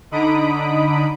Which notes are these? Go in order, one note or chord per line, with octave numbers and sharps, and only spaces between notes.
D3 D#4 B5 D#6 D7